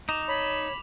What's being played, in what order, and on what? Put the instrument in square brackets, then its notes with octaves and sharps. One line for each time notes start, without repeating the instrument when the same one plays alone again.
[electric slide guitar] D#4 [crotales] D6 E7 F7
[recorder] C#5 [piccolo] B5